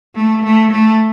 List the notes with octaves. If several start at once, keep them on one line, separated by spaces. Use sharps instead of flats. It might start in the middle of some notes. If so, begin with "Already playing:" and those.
A3
A3
A3